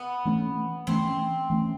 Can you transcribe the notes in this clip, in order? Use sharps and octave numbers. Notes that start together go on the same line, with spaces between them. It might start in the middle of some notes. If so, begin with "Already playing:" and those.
Already playing: B3
E3 A3 C#4
E3 A3 C4 C#4
E3 A3 C#4